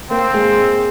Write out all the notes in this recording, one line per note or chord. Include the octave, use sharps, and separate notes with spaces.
A#3 C4
G#3